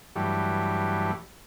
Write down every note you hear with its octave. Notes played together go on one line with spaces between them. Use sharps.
G2 E3 F#3 G3 A3